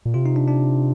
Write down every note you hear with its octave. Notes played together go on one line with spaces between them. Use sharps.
A#2
C3 F4
D#4
D4
D4